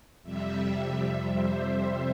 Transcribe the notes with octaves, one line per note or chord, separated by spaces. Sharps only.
F2 C3 G3 E5
C5